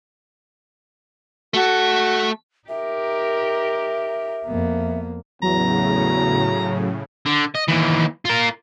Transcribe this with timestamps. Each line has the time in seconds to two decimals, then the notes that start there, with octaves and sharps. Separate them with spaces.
1.54 A3 F#4 A4
2.69 D#4 G4 A#4 E5
4.47 F2 A#3 B3
5.43 E2 A2 C#3 F#3 A#5
7.26 D3
7.55 D#5
7.68 D#2 E3
8.25 F4 A#4